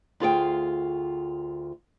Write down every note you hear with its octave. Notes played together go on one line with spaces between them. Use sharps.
D2 F4 G#4 G5